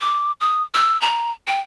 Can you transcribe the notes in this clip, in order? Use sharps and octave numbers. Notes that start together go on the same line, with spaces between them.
D6
D#6
E6
A#5
G5